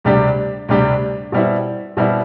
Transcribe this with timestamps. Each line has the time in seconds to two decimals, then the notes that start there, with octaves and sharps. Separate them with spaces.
0.04 D2 C3 G3 D4 G4
0.69 D2 C3 G3 D4 G4
1.32 B2 G3 C4 E4
1.97 B2 G3 C4 E4